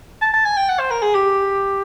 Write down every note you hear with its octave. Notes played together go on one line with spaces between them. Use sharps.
A5
A5
G#5
G5
F#5
C5
A#4
G#4
G4